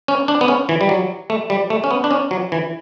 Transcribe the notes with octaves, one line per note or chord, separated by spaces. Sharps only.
C#4
D4
B3
C#4
E3
G3
F#3
A3
G3
A3
C#4
B3
D4
C#4
F#3
E3